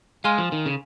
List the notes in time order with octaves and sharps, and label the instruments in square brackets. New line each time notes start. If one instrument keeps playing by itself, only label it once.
[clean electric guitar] G#3 [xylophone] F5 G#5 C6 F6
[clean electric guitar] F3
D#3
C#3